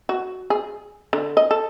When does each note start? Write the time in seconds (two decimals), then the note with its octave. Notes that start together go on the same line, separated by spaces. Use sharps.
0.09 F#4
0.50 G#4
1.13 D3
1.37 D#5
1.51 A4